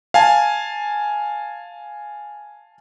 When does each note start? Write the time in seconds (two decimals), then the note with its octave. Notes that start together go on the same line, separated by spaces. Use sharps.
0.14 F5 G#5 A5